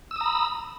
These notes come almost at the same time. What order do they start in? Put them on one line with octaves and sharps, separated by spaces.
E6 D#6 A#5 B5